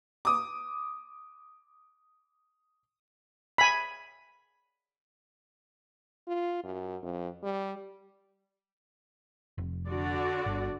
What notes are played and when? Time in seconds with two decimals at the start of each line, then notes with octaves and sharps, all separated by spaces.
0.25 D6 D#6
3.58 G#5 B5
6.27 F4
6.64 F#2
7.02 F2
7.43 G3
9.58 F1
9.88 D3 F#4 D5
10.46 G1